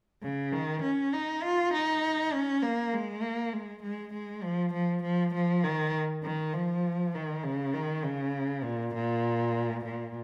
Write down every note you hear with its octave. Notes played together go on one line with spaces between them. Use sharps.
C#3
D#3
C#4
D#4
F4
D#4
C#4
A#3
G#3
A#3
G#3
G#3
G#3
F3
F3
F3
F3
D#3
D#3
F3
D#3
C#3
D#3
C#3
A#2
A#2
A#2